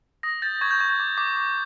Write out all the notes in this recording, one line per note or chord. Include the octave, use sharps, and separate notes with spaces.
D#6 A#6
G6 A6
C#6 G#6
G6
C#6 G#6
G6
D6
D6
D6